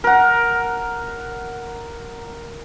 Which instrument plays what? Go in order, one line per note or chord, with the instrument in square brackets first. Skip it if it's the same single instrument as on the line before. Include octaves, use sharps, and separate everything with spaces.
[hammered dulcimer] A#4 F#5